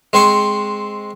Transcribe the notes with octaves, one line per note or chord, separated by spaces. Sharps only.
G#3 C4 C5 C#6